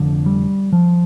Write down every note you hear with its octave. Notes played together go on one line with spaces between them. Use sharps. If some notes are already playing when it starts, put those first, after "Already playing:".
Already playing: F1 F2 D3
G3
F3